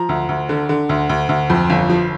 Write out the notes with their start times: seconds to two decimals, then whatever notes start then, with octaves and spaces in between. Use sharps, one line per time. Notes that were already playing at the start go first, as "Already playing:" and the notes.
Already playing: F3 A#5
0.09 D2
0.29 D2
0.49 D3
0.69 D3
0.89 D2
1.09 D2
1.29 D2
1.50 F2
1.70 G1
1.90 F3